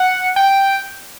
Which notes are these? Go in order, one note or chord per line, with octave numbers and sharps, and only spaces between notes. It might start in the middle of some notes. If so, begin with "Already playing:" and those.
Already playing: F#5
G5